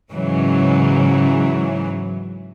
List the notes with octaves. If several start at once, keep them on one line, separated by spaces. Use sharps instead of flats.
G#2 C#3 E3 F#3